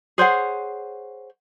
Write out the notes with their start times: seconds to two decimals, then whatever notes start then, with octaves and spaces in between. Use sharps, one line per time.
0.18 G#4 C5 C#5 F#5